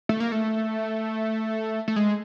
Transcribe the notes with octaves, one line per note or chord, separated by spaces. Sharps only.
A3
A#3
A3
A3
G#3